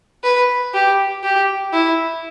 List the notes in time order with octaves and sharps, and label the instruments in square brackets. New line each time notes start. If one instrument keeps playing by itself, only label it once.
[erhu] B4
G4
G4
E4